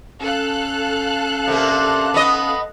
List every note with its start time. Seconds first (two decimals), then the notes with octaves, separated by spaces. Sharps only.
0.21 C#4 A4 F5 F#6
1.47 C3 A#3 D4
2.14 B3 D#5